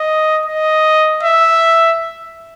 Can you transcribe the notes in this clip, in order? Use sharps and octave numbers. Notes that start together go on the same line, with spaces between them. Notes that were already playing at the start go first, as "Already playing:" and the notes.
Already playing: D#5
D#5
E5